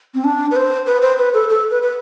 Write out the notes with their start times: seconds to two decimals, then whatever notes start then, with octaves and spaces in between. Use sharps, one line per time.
0.14 C4
0.24 D4
0.51 B4
0.56 C5
0.86 B4
1.02 C5
1.18 B4
1.34 A4
1.49 A4
1.70 B4
1.82 B4